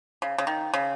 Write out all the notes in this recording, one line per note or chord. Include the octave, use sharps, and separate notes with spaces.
C#3
C#3
D#3
C#3